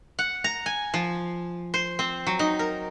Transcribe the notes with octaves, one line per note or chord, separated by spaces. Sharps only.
F#5
A#5
G#5
F3
C5
C4
F#3
D#4
A#4